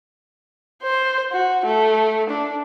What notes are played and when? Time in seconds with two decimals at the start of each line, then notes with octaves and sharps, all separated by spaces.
0.82 C5
1.32 F#4
1.65 A3
2.29 D4